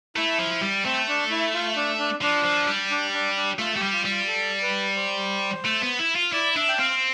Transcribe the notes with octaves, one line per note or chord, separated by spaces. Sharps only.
A3 E4
F3
G3
A3 C4
D4
E4
F4
D4
D4
F3 D4
F3
G3
D4
D4
D4
A3 F4
A3 G4
G3
F4
G3
F4
A4
B4
C5
A3
B3
E4
F4
E4 D5
D4 E5
G5
C4 F5